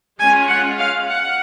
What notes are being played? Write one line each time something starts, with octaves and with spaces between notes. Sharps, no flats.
G#3 C#4 F4 G#5
F#5
F5
F#5